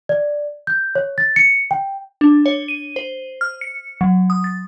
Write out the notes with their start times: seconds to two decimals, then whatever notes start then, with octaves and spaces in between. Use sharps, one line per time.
0.09 D5
0.67 G6
0.95 C#5
1.18 A6
1.36 C#7
1.71 G5
2.21 D4
2.46 C#5
2.68 D#7
2.96 C5
3.41 F6
3.61 C#7
4.01 F#3
4.30 D#6
4.44 A6